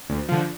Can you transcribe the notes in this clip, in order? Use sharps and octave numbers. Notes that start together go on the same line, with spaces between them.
D2
D3 F3